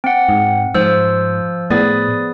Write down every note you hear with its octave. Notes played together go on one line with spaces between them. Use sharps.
C4 F#5
G#2
G#2 F3 C5 E6
A2 B3 G#4 B4 D5 D#6